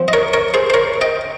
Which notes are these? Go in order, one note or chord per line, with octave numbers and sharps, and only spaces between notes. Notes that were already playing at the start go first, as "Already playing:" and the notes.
Already playing: F3 C4
D#5
A#4 C#5
A#4 C#5
G#4 C5
C5
A#4 C#5
D#5 G5